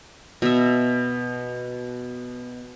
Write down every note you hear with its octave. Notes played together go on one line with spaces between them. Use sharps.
B2 E5